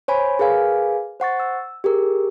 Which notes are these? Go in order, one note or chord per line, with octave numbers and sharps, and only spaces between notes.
C5 C#5 G#5 B5
G#4 A#4 B4 F5 G#5
C5 F#5 C#6 A6
E6
G4 G#4 A#4